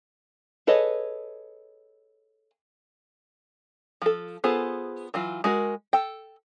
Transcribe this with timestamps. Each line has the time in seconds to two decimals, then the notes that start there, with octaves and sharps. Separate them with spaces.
0.67 G#4 A4 B4 C#5 D#5
4.02 F3 A4
4.44 B3 F4 G#4 A4 C5
5.14 E3 F#3 F4
5.44 G#3 F#4 A#4
5.93 A4 G5